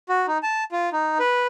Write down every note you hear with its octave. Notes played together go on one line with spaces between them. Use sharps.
F#4
D#4
A5
F4
D#4
B4